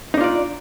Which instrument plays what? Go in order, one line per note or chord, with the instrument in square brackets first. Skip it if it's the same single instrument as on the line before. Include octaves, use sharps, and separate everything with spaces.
[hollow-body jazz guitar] D#4
D4
F4
D5